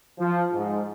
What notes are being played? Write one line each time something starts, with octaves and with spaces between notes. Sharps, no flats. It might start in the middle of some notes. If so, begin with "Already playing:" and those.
F3
G#2